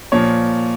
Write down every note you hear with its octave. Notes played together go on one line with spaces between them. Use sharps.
A#2 F3 C#5